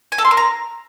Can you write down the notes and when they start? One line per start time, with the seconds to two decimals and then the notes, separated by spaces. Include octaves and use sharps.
0.12 G#5
0.18 A4
0.25 C6
0.31 A#4
0.37 A#5